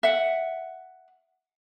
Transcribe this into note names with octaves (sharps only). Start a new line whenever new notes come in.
E5 F#5